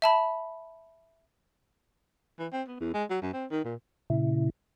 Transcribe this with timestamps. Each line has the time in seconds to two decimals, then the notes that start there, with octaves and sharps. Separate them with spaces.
0.02 E5 A5 B5
2.39 E3
2.52 C4
2.68 B3
2.80 E2
2.94 G#3
3.10 F#3
3.22 F#2
3.33 C4
3.51 D#3
3.65 A#2
4.10 A#2 C#3 E4